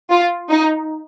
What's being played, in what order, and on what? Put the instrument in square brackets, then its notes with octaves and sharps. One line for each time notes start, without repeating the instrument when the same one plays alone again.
[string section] F4
D#4